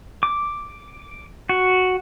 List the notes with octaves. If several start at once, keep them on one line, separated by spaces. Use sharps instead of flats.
D6
F#4